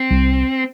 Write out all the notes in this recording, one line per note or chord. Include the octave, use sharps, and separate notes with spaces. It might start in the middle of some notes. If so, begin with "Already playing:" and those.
Already playing: C4
C2